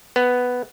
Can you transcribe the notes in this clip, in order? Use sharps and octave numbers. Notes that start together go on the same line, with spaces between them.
B3